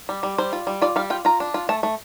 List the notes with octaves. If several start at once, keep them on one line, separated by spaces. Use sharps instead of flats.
G3
G3
G3 C5
F4
G3
F4 D5
G3 F5
F4 G5
F4 A#5
D4
F4
A3 A5
A3